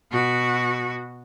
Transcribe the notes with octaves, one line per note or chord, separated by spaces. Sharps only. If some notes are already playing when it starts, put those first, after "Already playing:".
B2 F#4